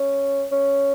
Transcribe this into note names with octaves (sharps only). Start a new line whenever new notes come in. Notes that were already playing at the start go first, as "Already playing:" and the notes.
Already playing: C#4
C#4